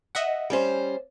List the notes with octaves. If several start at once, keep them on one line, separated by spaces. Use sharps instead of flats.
D#5 E5 F#5
G3 C#4 C5